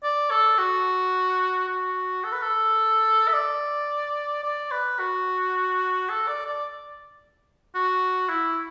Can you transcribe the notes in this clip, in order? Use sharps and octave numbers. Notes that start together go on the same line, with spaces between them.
D5
A4
F#4
F#4
A4
B4
A4
E5
D5
D5
B4
F#4
A4
D5
D5
F#4
E4